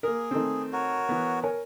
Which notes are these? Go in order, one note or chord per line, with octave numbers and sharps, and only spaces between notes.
A#3 G#4 A#4
D#3 A3 C4
F#4 A#4 C#5
E3 B3
A#4 C#5 G#5